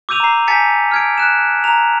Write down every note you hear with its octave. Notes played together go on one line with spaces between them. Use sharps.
D6 E6 G6 D#7 F7
A#5 C7
G#5 A5 G6 A6 B6 C#7
F6 G#6 D7
F#6 E7
A#5 F7